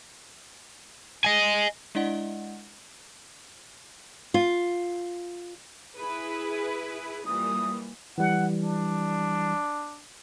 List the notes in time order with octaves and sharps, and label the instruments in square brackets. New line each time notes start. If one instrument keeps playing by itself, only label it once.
[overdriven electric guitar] D#5 G#5
[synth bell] G#3 D4 E4 D5 D#5 F#5
[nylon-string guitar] F4
[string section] E4 G#4 B4
[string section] A#2 E3 G3 [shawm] D#6
[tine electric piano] E3 G3 [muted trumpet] F#5
[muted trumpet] D4